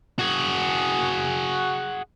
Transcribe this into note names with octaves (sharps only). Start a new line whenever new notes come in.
F#4 G#4